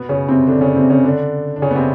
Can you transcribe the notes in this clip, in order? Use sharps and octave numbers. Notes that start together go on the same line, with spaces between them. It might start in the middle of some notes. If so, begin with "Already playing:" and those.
Already playing: B2 B3
C#3 C#4
C3 C4
D3 D4
D4
C#3 C#4
C3 C4
C#3 C#4
D3 D4
D4
C#3 C#4
B3
C3 C4